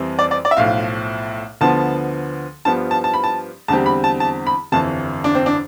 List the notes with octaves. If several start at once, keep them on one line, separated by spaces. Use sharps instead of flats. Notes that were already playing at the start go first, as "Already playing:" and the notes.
Already playing: F2 E3 G3 C4
D5
D5
D5
E5
B1 A2 F3 F5
D2 D3 F3 B3 A5
G2 F3 B3 A5
A5
A5
B5
A5
E2 D3 G3 C4 A5
B5
A5
A5
B5
G1 F2 E3 A5
D4
C4
D4